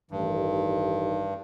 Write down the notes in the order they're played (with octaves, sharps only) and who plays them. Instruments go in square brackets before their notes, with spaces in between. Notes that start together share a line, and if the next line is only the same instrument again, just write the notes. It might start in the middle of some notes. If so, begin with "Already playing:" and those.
[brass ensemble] A1 D#3 [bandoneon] G2